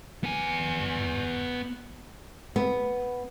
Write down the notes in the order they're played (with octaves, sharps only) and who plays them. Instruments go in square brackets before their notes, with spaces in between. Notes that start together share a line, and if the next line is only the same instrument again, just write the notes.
[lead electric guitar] B3 G#5
[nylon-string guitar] B3